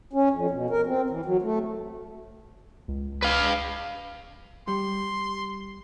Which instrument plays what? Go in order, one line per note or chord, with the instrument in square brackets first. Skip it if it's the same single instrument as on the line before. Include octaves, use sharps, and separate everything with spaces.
[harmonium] C#4
F2
B2
A#4
C4
E3
F#3
A3
[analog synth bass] C#2
[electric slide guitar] B4 F5
[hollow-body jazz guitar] G3 [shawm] C6